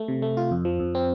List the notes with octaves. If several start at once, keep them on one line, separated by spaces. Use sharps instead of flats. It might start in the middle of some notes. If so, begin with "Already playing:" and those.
Already playing: A3
C3
A3
F4
F2
F3
F2
C4